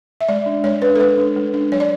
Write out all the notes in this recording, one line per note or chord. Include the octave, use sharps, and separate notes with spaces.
E5
G#3 D5
D4
G#3 C#5
D4 B4
A4
G#3 B4
D4
G#3
D4
F#3 C#5
D5